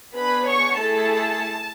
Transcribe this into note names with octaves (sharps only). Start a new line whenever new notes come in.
B3 D4 G#4 B4 B5
C#5 C#6
A3 E4 G#4 A4 A5